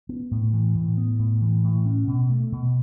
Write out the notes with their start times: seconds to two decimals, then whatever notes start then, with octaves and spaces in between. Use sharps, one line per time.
0.09 B3
0.31 A2
0.53 E3
0.75 A2
0.97 B3
1.19 A2
1.42 E3
1.64 A2
1.86 C#4
2.08 B2
2.30 A3
2.52 B2